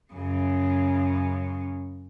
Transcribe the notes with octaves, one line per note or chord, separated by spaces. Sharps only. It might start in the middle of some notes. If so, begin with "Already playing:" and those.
F#2 C#3